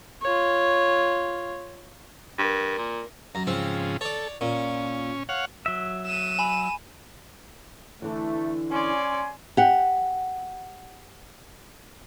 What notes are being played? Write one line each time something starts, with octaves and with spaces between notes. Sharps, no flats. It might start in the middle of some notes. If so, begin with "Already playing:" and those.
F4 C#5
G2 A#4
A#2
F#2 A#5
G#2 C#3 F3 C4
A4 C#5 D5
A#2 C#4
C#5 F5 F#5
F#3 E5
D#7 E7
G#5 B5
D3 E3 A3
C#4 D5 G#5 C6
G4 F#5